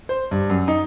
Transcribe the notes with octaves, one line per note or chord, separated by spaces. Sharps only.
C5
G2
F#2
D#4